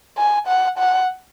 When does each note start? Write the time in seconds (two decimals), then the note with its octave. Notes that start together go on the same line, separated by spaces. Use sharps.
0.18 G#5
0.47 F#5
0.78 F#5